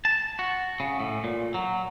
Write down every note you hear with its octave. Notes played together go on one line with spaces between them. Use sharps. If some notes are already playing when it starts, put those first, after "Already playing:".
A5
F#4
C#3
A2
A#2
F#3